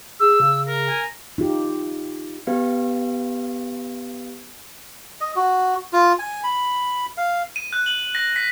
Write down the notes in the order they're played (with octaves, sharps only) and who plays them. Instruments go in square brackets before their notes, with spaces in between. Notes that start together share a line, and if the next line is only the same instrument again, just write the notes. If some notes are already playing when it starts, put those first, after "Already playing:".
[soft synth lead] G#4 [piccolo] E6
[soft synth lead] C#3
[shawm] A#4
[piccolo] G#5
[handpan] D#4 F4 G4
[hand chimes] B3 G4 B4 F5
[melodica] D#5
F#4
F4
G#5
B5
F5
[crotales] D#7
F#6
F#7
A#6
B6